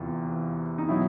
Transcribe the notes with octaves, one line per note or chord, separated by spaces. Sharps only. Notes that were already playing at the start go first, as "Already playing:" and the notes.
Already playing: E2 C3 E3 F4
D#4
B2 F#3 E4